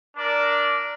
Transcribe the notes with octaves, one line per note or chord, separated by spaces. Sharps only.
D4 A#4 D5